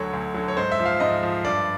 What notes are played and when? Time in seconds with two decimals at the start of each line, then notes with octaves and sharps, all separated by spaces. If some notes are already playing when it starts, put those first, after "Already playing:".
Already playing: D2 D3 F#3 C#5
0.13 D2
0.34 D3 F#3
0.48 C#5
0.57 G#2 C5
0.71 E5
0.79 F3
0.85 F5
1.00 G#2 D#5
1.23 F3
1.45 G2 D5